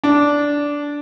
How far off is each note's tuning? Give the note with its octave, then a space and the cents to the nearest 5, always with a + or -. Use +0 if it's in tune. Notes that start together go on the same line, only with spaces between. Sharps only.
D4 -10